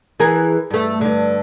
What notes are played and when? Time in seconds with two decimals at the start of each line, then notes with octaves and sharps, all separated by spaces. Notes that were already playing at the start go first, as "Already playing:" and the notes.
0.20 E3 G#4 A#4
0.70 G2 A3
1.01 G2 D3